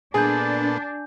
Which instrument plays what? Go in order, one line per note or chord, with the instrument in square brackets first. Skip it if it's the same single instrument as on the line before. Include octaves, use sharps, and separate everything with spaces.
[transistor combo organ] A#2 B3 A4 [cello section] D4 [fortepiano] G#4 [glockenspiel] G#5 G6